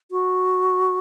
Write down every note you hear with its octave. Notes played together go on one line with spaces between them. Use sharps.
F#4